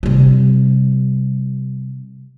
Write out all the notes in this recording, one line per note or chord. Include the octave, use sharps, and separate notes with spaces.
C3 G3